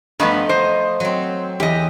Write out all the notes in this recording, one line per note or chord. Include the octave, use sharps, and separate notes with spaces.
G2 F3 A3 B3 D#4
C5 D#5
F#3 C4
E2 G4 D#5